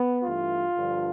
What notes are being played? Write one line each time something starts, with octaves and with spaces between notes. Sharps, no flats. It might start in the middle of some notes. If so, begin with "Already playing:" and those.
Already playing: B3
G2 E3 A3 F4
G2 D3 F3